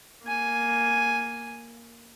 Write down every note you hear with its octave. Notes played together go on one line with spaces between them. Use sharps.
A#3 G#5